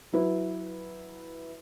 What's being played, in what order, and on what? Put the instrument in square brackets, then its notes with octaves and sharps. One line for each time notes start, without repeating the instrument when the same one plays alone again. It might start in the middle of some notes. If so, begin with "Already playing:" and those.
[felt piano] F#3 E4 B4